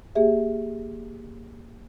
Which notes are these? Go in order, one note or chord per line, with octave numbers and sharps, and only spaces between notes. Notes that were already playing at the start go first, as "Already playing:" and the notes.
A#3 G4 G#4 E5